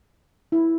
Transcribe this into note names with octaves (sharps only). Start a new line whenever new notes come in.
E4